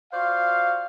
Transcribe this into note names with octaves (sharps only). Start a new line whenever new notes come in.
F4 F#4 C5 D5 F5